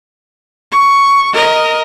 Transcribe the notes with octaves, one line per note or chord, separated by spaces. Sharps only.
C#6
A#4 D#5